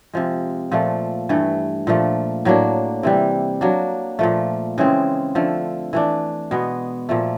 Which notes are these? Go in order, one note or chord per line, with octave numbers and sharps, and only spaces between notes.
C3 F3 G#3
A#2 F3 A3
G2 E3 A3
A#2 F3 A3
A2 F#3 A#3 D4
C3 E3 G3
F#3 A#3 D4
A#2 F3 A3
C#3 E3 G#3 C4
D3 F3 A3
E3 A3 D4
B2 G#3 B3
A#2 F3 A3